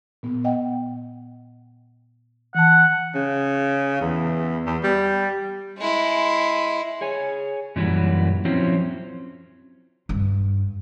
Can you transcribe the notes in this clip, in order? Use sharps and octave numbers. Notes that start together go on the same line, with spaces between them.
A#2 B3
D#5 F#5 G5
E3 F#5 A5
C#3
E2
E2
G3
G#3 E4
G#4 C#5 G#5
F#2 A#2 E3 F#3 G3 F#4
F3 F#3 C4 C#4 E4 C5
G2